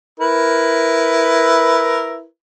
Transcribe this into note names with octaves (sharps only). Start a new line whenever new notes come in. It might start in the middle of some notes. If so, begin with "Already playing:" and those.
E4 A#4 B4